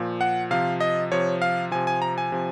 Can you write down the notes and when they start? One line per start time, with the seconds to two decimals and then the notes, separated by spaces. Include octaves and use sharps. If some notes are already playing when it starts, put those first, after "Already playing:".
Already playing: A#2 F3
0.21 F#5
0.51 C3 F3 F5
0.81 D#5
1.12 C3 F3 C#5
1.42 F5
1.71 C3 F3 G#5
1.87 G#5
2.02 A#5
2.18 G#5
2.32 C3 F3